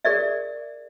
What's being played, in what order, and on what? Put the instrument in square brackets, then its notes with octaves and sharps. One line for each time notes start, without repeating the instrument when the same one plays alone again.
[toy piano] G#4 A#4 D5 E5